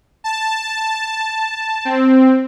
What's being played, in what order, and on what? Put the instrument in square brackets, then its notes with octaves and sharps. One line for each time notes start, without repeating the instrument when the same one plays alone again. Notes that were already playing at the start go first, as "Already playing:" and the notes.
[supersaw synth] A5
C4